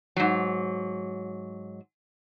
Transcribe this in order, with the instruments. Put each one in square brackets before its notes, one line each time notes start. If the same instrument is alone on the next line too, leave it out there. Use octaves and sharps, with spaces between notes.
[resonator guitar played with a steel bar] G#2 F#3